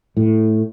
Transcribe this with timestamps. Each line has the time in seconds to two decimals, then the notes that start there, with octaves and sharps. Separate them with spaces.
0.17 A2